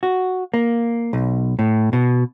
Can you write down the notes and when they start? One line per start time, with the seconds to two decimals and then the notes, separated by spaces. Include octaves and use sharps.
0.03 F#4
0.54 A#3
1.13 B1
1.59 A2
1.93 B2